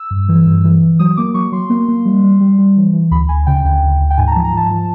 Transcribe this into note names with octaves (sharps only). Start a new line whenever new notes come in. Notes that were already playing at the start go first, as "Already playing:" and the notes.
Already playing: E6
G2
E3
G2
E3
E3
F#3 D#6
A#3 D6
F#3 C#6
F#3 C6
A#3
A#3
G3
G3
G3
G3
E3
E3
D2 B5
D2 G#5
C#3 G5
D2 G5
D2
D2
G5
G#2 G#5
A#5
A5
F3
A#5
F3 A5
F3